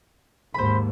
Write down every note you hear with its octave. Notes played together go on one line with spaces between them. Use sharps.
D#2 G#2 C5 B5